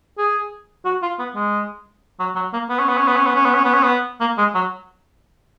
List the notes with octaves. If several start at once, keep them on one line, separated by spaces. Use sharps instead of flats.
G#4
F#4
F4
B3
G#3
F#3
F#3
A#3
B3
C#4
B3
C#4
B3
C#4
B3
C#4
B3
C#4
B3
C#4
B3
A#3
G#3
F#3